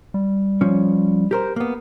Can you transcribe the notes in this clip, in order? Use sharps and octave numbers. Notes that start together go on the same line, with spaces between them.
G3
F3 C#4
G4 A#4 C5
A#3 B3